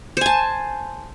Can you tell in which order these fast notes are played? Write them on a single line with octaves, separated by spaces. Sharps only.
C5 G#5 A5